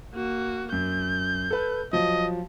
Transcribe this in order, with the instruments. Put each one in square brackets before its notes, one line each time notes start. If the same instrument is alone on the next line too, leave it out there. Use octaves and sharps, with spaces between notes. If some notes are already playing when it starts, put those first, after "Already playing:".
[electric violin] A#3 F#4
[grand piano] F#2 [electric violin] G6
[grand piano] A4 B4
[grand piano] F3 F#3 [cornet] D#5